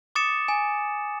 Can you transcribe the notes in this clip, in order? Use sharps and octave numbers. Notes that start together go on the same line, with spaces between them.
D6 D#6 A6 C#7 E7
G#5